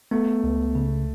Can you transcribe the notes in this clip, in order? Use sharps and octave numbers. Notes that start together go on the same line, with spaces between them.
A3 B3
C#2
C#3